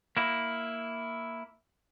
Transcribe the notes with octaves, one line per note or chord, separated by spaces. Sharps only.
A#3 E4